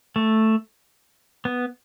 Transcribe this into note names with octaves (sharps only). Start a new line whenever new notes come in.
A3
B3